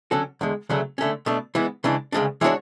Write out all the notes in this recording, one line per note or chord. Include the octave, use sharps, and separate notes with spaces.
D3 F#3 C#4 F#4 A4
E2 D3 G#3
D2 C#3 F#3 A3
D3 A3 C#4
B2 A3 D4
E3 G#3 B3
C#3 E3 G#3 D4
D2 C#3 G#3 D4
E3 G#3 D4 F#4 C#5